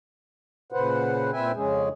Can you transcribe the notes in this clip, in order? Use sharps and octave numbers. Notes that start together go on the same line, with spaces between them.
A#2 C#3 B4 C5 F#5
A#2 C4 B4 E5 G5 G#5
F2 C#3 G#3 C#4 G#4